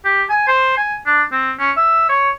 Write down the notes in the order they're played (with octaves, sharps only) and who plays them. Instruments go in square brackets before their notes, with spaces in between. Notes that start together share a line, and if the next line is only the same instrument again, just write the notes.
[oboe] G4
G#5
C5
G#5
D4
C4
C#4
E5
C#5